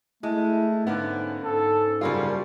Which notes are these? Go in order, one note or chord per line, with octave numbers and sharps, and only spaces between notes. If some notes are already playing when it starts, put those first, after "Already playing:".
G#3 A3 E4
G#2 D3 A#3 B3 C#4
G#2 A4
F#2 C#3 G3 A#3 F4